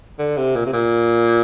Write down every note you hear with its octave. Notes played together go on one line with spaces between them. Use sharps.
D3
C3
A#2
C3
A#2